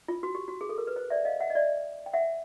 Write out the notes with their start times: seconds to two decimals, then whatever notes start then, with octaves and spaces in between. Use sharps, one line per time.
0.08 F4
0.23 F#4
0.35 G4
0.48 F#4
0.61 G#4
0.69 A4
0.78 A#4
0.87 B4
0.96 C5
1.10 D5 E5
1.25 D#5 F5
1.40 E5 F#5
1.50 D#5
1.55 D5 E5
2.06 G5
2.13 E5 F#5